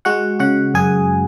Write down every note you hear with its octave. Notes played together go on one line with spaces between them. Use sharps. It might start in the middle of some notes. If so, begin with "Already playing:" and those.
G#3 F#4 F#5
C#3 F#4 F#5
F#2 G#4 G#5